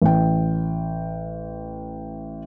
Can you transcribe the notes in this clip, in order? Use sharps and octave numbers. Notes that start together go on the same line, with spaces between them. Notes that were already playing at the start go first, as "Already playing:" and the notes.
A1 G5